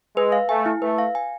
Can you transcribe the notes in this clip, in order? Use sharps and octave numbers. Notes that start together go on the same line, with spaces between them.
G#3 B4
F5
A3 G#5
E4
A3 B4
F5
G#5